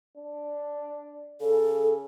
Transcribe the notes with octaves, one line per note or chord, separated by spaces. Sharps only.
D4
C#3 A4